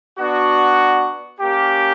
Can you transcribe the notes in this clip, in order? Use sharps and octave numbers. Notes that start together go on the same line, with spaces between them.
B3 D4 F#4
A#3 C#4 G4